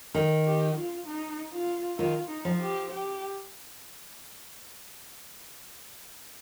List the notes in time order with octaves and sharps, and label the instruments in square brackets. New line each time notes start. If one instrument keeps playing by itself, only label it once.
[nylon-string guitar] D#3
[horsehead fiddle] G4
F4
D#4
F4
[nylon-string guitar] D#3 [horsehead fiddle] F4
[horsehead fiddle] D#4
[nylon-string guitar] F3
[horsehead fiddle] G4
G4